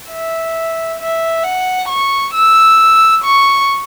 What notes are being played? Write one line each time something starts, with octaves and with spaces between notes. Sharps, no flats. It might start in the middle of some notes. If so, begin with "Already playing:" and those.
E5
E5
F#5
C#6
E6
C#6